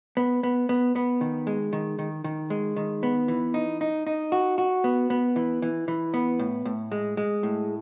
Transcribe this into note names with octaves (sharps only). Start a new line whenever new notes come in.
B3
B3
B3
B3
D#3
G#3
D#3
D#3
D#3
G#3
D#3
B3
E3
D#4
D#4
D#4
F#4
F#4
B3
B3
E3
E3
E3
B3
A2
A2
G#3
G#3
A2